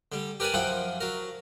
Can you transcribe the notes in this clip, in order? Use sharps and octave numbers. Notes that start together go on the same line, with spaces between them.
D3 G3
G4 A#4 B4 D5 G#5
F#2 F3 E4 F#5 G5
F#3 A#4